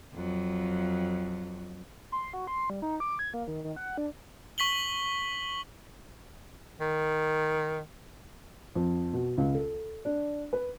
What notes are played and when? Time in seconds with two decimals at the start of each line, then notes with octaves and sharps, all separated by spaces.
0.14 F2 F#3
2.12 C6
2.33 F#4
2.47 C6
2.70 G3
2.82 D#4
3.00 D6
3.19 G#6
3.34 A#3
3.48 D#3
3.64 D#3
3.76 F#5
3.98 D4
4.58 C#6 B6 F#7 G7
6.80 D#3
8.75 F2
9.13 B2
9.38 C#2
9.54 A4
10.05 D4
10.53 B4